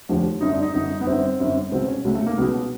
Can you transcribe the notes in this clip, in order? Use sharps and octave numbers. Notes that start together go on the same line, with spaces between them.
F1 D#2 D3 F3
G1 F#2 D3 D#4
D4
D#4
G1 F#2 D3 D#4
B3
G1 F#2 D3 C4
G1 F#2 D3
C#2 B2 F#3 C4
C#4
C#2 B2 F#3 A3
A3
A#3
C#2 B2 F#3 B3